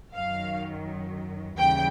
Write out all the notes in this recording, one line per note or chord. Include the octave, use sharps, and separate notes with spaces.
F#2 D#3 F#3 F5
D#2 C#3 E3 G3 G5